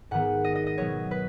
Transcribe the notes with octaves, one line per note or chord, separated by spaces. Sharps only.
G#2 D#3 B3 F#5
D#5
D#5
D#5
B2 F#3 B3 C#5
B4